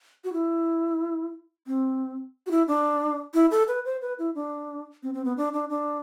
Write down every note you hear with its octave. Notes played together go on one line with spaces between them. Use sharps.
F#4
E4
C4
F#4
E4
D4
E4
A4
B4
C5
B4
E4
D4
C4
C4
B3
D4
D4
D4